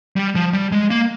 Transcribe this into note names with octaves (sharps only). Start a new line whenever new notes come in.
G3
F3
G3
G#3
A#3